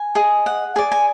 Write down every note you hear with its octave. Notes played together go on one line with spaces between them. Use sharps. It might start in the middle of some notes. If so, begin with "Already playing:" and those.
Already playing: G#5
G#4 D#5
F#5
G#4 D5 G#5
G#5